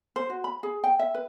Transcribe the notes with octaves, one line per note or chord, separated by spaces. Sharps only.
C5
F#4
B5
G#4
G5
E5
B4